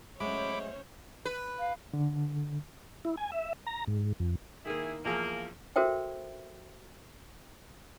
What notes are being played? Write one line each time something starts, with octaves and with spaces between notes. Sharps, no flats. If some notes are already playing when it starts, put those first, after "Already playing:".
A2 F#3 G#3 C#4 C5 C#5 B5 D6
B4
F5
D3
E4
G#5
E5
A#5
G#2
F2
D#3 A#3 E4 G#4
E2 F3 A#3 G#4
F#4 A4 A#4 C5 E5 G5